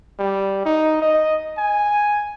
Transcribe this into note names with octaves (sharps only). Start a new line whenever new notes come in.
G3
D#4
D#5
G#5